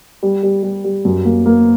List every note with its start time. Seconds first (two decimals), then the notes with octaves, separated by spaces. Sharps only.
0.23 G3
0.43 G3
0.63 G3
0.84 G3
1.05 F#2
1.25 A#3
1.46 A#3